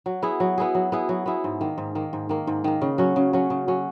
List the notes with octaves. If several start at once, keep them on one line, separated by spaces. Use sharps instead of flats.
F#3
B3 E4 G#4
F#3
B3 E4 G#4
F#3
B3 E4 G#4
F#3
B3 E4 G#4
G#2
D#3 A#3
G#2
D#3 A#3
G#2
D#3 A#3
G#2
D#3 A#3
C#3
F#3 C#4
C#3
F#3 C#4
C#3
F#3 C#4